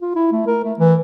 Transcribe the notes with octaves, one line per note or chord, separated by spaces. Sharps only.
F4
E4
A3
A#4
A3
E3